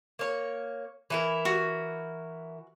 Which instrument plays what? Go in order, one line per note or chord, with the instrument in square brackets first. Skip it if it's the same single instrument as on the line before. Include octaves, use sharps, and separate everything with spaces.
[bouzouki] A#3 C#5
E3 E4 A#4
[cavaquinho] F#4